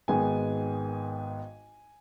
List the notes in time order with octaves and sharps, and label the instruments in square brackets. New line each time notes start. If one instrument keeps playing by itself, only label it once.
[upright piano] G#1 G#2 D#3 G#3 B3 G#5